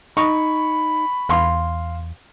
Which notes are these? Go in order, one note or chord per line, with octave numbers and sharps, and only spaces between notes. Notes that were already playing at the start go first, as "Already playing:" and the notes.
D#4 B5 C#6
E2 F5 C6